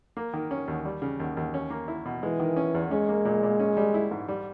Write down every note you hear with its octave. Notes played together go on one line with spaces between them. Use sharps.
A#3
D#3
C#4
D#2
G3
C#3
D#2
D#2
C#4
A#3
E4
B2
E3 G#3
D#3
C#4
E2
G#3 C#4
A#3
A#2
A#2
C#4
G3
E4
G#2
G3